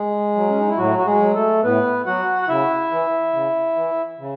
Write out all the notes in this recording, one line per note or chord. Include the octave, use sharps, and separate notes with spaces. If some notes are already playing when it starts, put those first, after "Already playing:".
Already playing: G#3 G#4
F#3
C#4
D#4
E4
A2 F#3 F#4
F#4
G#3 G#4
F#3
A3 A4
A2 B3 B4
F#3 F#4 F#5
F#5
C#3 E4 E5
E3
C#3
E3
C#3